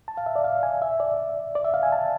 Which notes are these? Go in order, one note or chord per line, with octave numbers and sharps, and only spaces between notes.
A5
F5
E5
D5
F5
G#5
E5
D5
D5
E5
F5
G#5
A5